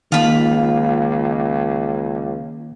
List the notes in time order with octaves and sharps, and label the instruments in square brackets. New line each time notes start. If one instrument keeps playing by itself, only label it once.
[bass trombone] C#2 [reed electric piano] D#3 A#3 [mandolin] F4 B5